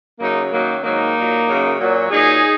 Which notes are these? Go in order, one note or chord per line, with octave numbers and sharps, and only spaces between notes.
F#2 C#3 F#3 A#3 D#4
F#2 D#3 F#3 A#3 D#4
G#2 D#3 F#3 A#3 D#4
A#2 F#3
F#2 C#3 F#3
A#2 F#3
A#2 F#3 D#4 G#4